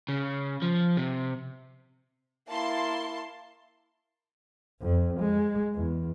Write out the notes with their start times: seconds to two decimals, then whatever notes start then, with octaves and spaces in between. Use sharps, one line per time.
0.08 C#3
0.62 F3
0.97 C3
2.50 A#3 E4 A5 C6
4.82 F2
5.20 G#3
5.75 E2